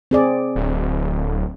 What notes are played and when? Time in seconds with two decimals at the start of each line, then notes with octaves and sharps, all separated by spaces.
0.11 C4 G#4 D5
0.55 D1